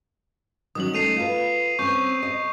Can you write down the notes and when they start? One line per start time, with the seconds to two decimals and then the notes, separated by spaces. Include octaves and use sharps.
0.75 D#3 F#3 C#4 D#6 F#7
0.94 A3 C#4 D#4 C7 D#7 F7
1.16 F4 B4
1.79 C4 C#4 C#6 G6
2.23 D#5